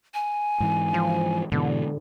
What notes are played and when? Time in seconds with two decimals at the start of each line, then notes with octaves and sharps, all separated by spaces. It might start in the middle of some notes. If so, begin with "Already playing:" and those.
0.14 G#5
0.60 G#2 E3
0.94 F3
1.52 G#2 B2 D3 E3